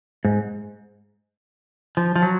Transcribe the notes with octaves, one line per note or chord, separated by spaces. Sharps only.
G#2
F3
F3
F#3